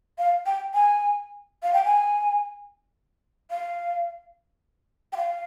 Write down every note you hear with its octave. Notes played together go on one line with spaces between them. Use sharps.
F5
G5
G#5
F5
G5
G#5
F5
G5
F5